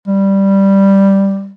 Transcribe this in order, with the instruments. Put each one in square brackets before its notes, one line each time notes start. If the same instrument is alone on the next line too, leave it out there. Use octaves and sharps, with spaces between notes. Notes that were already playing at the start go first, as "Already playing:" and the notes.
[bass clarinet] G3